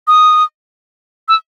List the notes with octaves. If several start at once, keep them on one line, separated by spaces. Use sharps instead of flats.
D#6
E6